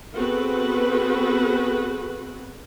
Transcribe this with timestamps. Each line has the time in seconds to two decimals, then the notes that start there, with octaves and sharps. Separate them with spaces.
0.15 B3 C4 F#4 G#4 A4 B4